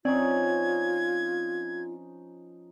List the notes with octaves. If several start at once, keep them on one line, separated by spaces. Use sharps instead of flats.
F3 C4 C#4 D#4 F4 D5 G#6